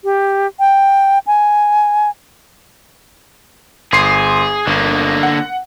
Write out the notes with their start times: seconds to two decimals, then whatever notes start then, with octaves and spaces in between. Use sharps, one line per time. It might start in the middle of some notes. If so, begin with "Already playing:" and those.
0.04 G4
0.60 G5
1.27 G#5
3.92 G1 G#4 C6 C7
4.67 G1 D3 A#3
5.23 F#5